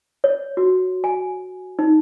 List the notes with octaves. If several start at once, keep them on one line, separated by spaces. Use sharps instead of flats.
C#5
F#4
G#5
D#4